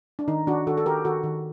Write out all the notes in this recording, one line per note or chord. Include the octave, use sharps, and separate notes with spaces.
D4
D#3 D#4
D#3 D4 F#4
D#3 F#4 A4
A4
D#3 G4 A#4
D#3 F#4 A4
D#3